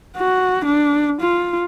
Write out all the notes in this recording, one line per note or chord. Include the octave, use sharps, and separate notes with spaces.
F#4
D4
F4